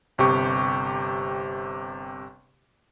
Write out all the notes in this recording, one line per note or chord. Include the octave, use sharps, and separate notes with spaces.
G1 C3 G4 C#6